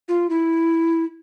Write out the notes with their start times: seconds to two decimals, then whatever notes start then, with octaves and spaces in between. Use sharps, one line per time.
0.08 F4
0.30 E4